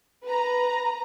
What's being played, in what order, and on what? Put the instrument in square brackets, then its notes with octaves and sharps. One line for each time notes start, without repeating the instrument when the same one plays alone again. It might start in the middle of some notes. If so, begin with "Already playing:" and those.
[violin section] B4 A#5